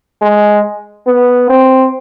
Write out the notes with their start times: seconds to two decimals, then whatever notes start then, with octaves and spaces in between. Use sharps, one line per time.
0.22 G#3
1.07 B3
1.50 C4